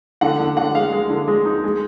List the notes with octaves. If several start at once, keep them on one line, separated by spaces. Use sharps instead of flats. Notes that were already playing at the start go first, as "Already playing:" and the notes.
D3 F#5
D3
D3 F#5
G#3 F5
G#3
D3
G#3
D#4
G#3